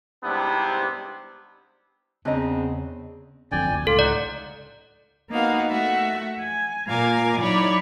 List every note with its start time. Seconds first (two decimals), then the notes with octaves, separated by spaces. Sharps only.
0.24 G#2 C3 G3 B3 D4 E4
2.25 E2 C#3 C4 D4 D#5 A#5
3.52 G1 F2 D3 D5 G5 G#5
3.74 D2
3.87 C#2 A2 F4 A4
3.99 D#4 D5 F#5
5.30 A#3 B3 D#4 F#4 F5
5.70 A3 F#4 E5
6.41 G#5
6.88 A#2 A#3 F5 G#5 A#5 D6
7.41 F#3 D#4 E4 C#5 D5 B5